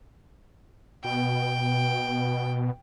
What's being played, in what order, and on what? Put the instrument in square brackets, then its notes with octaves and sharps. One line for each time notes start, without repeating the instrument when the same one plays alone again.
[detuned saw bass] B2 [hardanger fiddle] G5